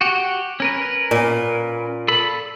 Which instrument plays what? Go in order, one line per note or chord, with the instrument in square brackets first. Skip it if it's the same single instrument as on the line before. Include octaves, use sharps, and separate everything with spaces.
[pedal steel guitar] F#4 G4
C#4 A#4 B4
[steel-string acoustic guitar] A#2
[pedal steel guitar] A4 B5